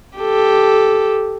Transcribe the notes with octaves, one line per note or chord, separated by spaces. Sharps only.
G4 A4